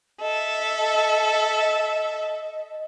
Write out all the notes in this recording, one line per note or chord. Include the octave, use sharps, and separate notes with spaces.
A4 D#5 E5